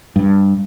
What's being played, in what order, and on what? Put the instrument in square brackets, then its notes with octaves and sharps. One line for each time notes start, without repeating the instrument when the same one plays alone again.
[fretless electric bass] G2